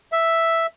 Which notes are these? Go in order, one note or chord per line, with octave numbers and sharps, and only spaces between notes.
E5